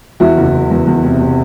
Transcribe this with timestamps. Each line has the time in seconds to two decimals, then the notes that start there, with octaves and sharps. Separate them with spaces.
0.20 E2 E4 F#4
0.37 F#1
0.54 F#1
0.71 E2
0.87 E2
1.04 C3
1.21 C3